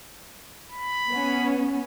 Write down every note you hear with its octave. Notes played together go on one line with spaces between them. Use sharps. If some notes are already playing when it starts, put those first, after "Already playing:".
B5
B3 C#4